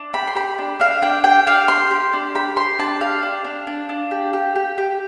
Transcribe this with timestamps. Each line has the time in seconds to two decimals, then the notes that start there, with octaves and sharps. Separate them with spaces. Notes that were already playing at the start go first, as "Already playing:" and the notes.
Already playing: D4
0.13 G4 B5
0.27 C6
0.35 G4 B5
0.58 D4
0.80 D4 F5
1.02 D4 G5
1.24 G4 G5
1.46 D4 F5
1.68 G4 C6
1.91 G4
2.13 D4
2.35 G4 B5
2.56 G4 C6
2.79 D4 A5
3.01 G4 F5
3.23 D4
3.44 D4
3.67 D4
3.89 D4
4.11 G4
4.33 G4
4.55 G4
4.78 G4